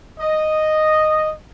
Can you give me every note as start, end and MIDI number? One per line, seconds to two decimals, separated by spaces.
0.20 1.31 75